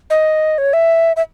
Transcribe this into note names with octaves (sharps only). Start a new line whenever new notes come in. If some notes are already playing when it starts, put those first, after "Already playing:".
D#5
C#5
E5
E5